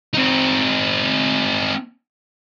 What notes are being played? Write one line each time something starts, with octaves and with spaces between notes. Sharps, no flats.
C4 D#4